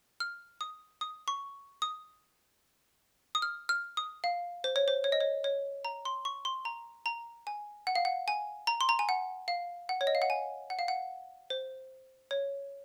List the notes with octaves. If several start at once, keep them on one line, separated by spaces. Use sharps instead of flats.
F6
D#6
D#6
C#6
D#6
D#6
F6
F6
D#6
F5
C5
C#5
C5
C#5
D#5
C#5
C#5
A#5
C6
C#6
C6
A#5
A#5
G#5
F#5
F5
F#5
G#5
A#5
C6
A#5
G#5
F#5
F5
F#5
C#5
D#5
F5
F#5
G#5
F#5
F5
F#5
C5
C#5